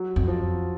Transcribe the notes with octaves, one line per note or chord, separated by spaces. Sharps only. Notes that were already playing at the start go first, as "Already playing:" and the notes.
Already playing: F#3
F2
F3